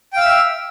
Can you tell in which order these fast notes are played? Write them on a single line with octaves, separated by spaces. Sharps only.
G5 F5 E6 E5